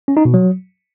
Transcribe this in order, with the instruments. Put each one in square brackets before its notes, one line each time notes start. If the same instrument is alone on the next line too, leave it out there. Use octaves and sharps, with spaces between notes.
[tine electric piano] C#4
D#4
B2
F#3